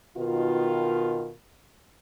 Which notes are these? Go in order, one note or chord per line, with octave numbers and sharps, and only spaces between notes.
B2 D#3 F4